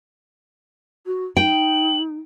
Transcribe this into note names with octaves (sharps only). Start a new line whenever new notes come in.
F#4
D#4 G5 F#7